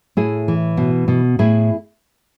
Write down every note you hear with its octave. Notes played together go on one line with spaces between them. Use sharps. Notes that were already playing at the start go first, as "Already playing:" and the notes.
A2 E4 G#4
E3
B2
B2
A2 E4 G#4